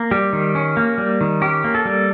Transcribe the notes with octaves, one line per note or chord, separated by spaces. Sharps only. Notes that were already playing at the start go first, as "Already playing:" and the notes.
Already playing: A#3
G3 G4
D#3
C#4
A#3
G3
D#3
C#4 G4
A#3
A4
G3